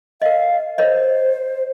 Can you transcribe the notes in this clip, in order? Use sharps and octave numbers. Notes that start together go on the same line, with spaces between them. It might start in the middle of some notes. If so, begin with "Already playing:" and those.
A#4 D#5 F5
A#4 C5 C#5 D#5